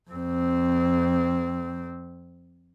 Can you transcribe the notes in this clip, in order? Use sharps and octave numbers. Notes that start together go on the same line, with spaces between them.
F2 C4